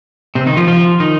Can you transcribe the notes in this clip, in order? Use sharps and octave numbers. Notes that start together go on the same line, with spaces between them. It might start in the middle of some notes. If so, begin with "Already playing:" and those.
C3 C4
D#3 D#4
F3 F4
F3 F4
D#3 D#4